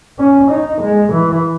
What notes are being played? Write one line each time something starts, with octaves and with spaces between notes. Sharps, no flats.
C#4
D#4
G#3
E3